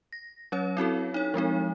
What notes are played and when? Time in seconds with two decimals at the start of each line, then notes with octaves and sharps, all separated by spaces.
0.13 A#6
0.52 F#3 C#4 C#5
0.77 C4 E4 F#4 A4
1.14 D#4 C#5
1.34 F3 G#3 C4 D#4